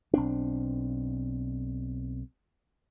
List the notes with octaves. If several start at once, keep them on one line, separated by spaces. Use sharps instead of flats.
B1 C4 D4